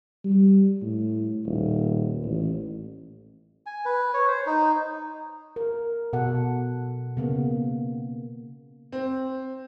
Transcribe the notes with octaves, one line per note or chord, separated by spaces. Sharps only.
G3
A2
D#1
A1
G#5
B4
C#5
C5
D#4
A#4
B2 A4 F#5
C#3 A#3 B3
C4